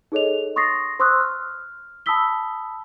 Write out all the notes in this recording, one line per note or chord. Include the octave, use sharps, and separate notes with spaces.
D#4 G#4 A4 C#5 D#5 F7
C6 C#6 D#6 A6 A#6 C7
C5 C6 C#6 D#6 E6 F#6
F6
A5 B5 D#6 E6 B6 G7